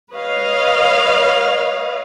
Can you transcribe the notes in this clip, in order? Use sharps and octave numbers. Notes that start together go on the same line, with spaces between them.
B4 C#5 D#5 F5